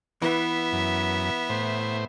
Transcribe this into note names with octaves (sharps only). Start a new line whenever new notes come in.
E3 B3 E5
F#2
A2 C5